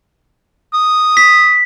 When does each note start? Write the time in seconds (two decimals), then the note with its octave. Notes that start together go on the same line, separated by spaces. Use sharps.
0.74 D#6
1.17 B6